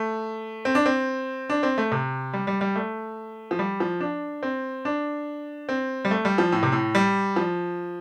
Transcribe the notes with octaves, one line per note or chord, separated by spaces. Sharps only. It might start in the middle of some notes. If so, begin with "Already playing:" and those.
Already playing: A3
C4
D4
C4
D4
C4
A3
C3
G3
G3
G3
A3
F3
G3
F3
D4
C4
D4
C4
G3
A3
G3
F3
A2
C3
A2
G3
F3